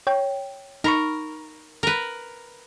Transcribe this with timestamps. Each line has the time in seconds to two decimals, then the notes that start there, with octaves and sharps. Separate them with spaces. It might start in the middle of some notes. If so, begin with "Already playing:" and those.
0.07 C#5 G5
0.84 D#4 A#4 B5 C#6
1.83 A#4 B4